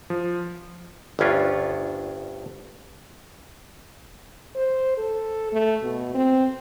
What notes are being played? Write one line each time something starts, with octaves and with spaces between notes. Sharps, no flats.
F3
G1 D2 G2 C#4 D4 F4
C5
A4
A3
B2
C4